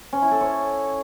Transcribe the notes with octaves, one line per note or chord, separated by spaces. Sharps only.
C#4
E4
A4
C#5